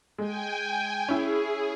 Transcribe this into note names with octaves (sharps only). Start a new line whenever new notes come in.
G#3 G5 G#5
C#4 E4 G#4